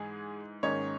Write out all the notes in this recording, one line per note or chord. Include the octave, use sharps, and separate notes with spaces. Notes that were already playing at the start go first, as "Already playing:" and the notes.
Already playing: G#2 E3 G#3 G#4
G#2 D#3 A#3 C#4 D#4 C#5